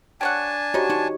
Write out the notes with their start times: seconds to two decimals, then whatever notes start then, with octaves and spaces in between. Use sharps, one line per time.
0.21 D4 G4 C#5 F#5 G#5 A5
0.74 D#4 F#4 G4 C5 C#5
0.90 D#4 C5 C#5